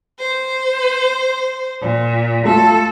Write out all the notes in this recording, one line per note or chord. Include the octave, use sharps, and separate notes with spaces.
C5
A#2
A3 F4 A4